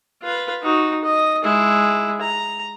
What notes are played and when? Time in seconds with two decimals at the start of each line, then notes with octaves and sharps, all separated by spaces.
0.22 F4 B4
0.63 D#4 F#4
1.04 D#5
1.43 G#3 E4
2.21 A#5